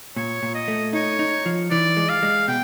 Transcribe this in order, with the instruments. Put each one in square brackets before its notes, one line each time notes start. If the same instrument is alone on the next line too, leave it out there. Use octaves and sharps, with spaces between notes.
[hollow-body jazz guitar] A#2 [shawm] C#5
[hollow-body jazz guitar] A#2
[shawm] D#5
[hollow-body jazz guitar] A3
[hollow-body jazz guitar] D#4 [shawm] C#5
[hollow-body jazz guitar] D#4
F3
[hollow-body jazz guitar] E3 [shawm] D5
[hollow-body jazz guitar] G#3
[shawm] F5
[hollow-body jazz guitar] G#3
[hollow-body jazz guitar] B2 [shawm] G5